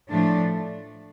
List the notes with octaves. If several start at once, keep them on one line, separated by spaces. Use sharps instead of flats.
A2 F3 A3 D4